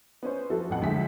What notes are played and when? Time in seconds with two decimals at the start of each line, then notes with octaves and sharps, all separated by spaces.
0.23 B3 C#4 C5
0.50 F3 B3 E4 F#4 A4 B4
0.70 A1 F2 F#5
0.82 D2 F3 G#3 G#4 E5 B6